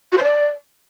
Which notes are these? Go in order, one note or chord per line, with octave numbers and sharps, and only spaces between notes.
F#4
C5
D5